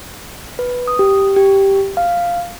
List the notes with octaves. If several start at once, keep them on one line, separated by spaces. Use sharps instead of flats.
B4
D#6
G4
G4
F5